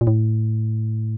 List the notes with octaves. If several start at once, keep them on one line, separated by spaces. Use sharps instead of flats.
A#2
A2